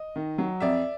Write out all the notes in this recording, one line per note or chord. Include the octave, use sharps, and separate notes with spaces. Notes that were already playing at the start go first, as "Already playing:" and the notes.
Already playing: D#5
D#3
F#3
F2 D5 E5